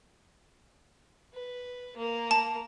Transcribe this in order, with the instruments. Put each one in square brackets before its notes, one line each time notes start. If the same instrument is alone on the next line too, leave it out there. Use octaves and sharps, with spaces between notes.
[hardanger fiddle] B4
A#3 A#4
[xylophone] A5